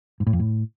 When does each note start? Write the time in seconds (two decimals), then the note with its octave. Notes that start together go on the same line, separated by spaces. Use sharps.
0.20 G#2
0.27 A2
0.33 F2
0.39 A2